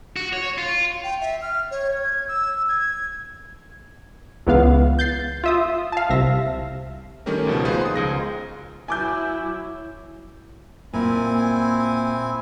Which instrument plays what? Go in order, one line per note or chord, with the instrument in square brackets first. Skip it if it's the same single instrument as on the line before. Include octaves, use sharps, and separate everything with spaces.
[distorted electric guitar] F#4
C#5
F4
[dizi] G5
E5
F6
C#5
G#6
E6
G#6
[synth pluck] C#2 E3 B3 F5
G6 A6 C7
F4 E5 D#6
F5 A5
C2 C3 E5 A#6
[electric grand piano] D#3 G3 A3 C#4 G4 A#4
C#2 B2 F3
B3 D#4 F4 G#4 B4 C5
C6 D#6
C#2 G#4 A#6
[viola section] F#3 E4 [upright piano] G#5 D6 G6
[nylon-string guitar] A#2 [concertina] C4 E4 G#5